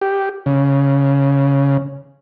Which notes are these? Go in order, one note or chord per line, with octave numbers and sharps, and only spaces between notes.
G4
C#3